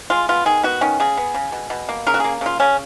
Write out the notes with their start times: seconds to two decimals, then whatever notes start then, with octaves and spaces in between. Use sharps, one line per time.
0.10 G#3 F4
0.29 B3 F4
0.46 D#3 G#4
0.63 B3 F#4
0.81 D#3 C#4
1.00 C#3 G#4
1.17 B3
1.34 C#3
1.52 B2
1.70 B2
1.89 A#3
2.07 C#3 A#4
2.14 F#4
2.20 A#3 G#4
2.41 C#3 F4
2.60 C#3 C#4